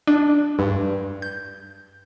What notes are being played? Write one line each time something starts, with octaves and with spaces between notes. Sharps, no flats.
D4
G2
G6